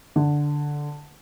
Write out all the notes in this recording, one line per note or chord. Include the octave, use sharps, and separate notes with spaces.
D3